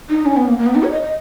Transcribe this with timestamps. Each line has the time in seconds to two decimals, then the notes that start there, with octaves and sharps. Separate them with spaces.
0.10 D#4
0.26 C#4
0.37 B3
0.47 A#3
0.59 A#3
0.66 B3
0.75 D#4
0.83 C#5
0.91 D#5
1.02 D#5